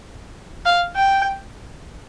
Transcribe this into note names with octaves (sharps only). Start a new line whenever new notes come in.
F5
G5